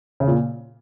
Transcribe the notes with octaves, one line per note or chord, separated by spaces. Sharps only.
C#3
A#2